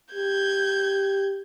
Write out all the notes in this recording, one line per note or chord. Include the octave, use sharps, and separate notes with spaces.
G4 G6 G#6